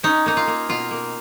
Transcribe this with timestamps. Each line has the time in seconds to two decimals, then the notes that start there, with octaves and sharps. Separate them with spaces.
0.03 C#4 D#4
0.26 A#3 D#4
0.37 F4
0.47 A#3
0.69 B2 F4
0.91 A#3